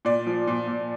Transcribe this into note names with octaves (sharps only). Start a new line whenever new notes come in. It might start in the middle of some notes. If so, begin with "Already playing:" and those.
A#2 D5
F3
A#2
A#2